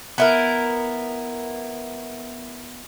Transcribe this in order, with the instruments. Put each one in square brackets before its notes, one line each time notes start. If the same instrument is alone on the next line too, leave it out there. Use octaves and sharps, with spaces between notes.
[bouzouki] B3 E4 A#4